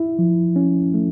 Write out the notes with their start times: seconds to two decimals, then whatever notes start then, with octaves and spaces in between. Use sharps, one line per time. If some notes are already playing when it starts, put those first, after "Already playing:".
Already playing: E4
0.19 F3
0.56 C#4
0.94 A3